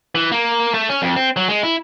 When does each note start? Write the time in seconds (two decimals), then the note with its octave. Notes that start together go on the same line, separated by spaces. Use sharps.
0.15 E3
0.32 A#3
0.74 A3
0.89 C#4
1.02 F2
1.16 C4
1.36 F#3
1.48 G#3
1.63 E4